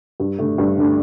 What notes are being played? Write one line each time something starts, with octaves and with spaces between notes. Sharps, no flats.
G2
D3 A3 D4
G2
D3 A3 D4